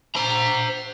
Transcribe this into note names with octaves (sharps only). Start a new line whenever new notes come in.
C5 A#5